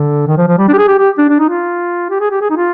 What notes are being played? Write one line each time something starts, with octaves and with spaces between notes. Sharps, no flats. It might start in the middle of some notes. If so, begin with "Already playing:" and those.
Already playing: D3
D#3
F3
F3
G3
D4
G4
G#4
G4
G4
D4
D4
D#4
F4
G4
G#4
G4
G#4
D#4
F4